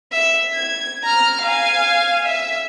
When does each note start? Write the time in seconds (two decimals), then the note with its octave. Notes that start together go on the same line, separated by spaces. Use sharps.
0.12 E5
0.54 G#6
1.04 A#5 F6
1.42 F5 G#5
2.26 E5